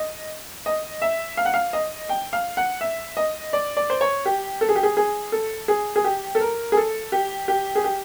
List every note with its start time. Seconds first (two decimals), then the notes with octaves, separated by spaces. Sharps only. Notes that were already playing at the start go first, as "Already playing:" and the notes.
Already playing: D#5
0.66 D#5
1.02 E5
1.37 F5
1.45 F#5
1.54 F5
1.73 D#5
2.09 G5
2.33 F5
2.57 F#5
2.81 E5
3.17 D#5
3.53 D5
3.77 D5
3.90 C5
4.01 C#5
4.26 G4
4.61 A4
4.69 G#4
4.76 G4
4.83 G#4
4.97 G#4
5.32 A4
5.68 G#4
5.96 G#4
6.04 G4
6.35 A4
6.41 A#4
6.72 G#4
6.77 A4
7.12 G4
7.48 G4
7.75 G#4
7.84 G4